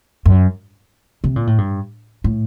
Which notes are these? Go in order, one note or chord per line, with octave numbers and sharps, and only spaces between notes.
F#2
C3
A#2
A2
G2
A2